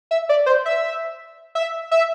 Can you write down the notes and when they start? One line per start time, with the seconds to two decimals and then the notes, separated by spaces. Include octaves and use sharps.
0.11 E5
0.29 D5
0.46 C5
0.66 E5
1.55 E5
1.91 E5